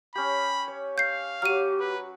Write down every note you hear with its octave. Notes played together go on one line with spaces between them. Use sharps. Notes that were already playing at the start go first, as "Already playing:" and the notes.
C#4 G4 B5
C#5
F5 G6 C7
F#3 G4 F6 D#7
B4